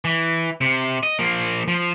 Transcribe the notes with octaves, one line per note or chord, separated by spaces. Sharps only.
E3
C3
D#5
F3 A#3
F3